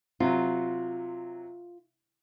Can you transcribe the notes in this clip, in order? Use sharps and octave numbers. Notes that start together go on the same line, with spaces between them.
C3 F#3 F4